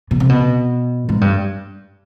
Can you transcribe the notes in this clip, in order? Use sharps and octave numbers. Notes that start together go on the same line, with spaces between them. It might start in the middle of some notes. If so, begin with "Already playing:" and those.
B2
C3
B2
G#2
G2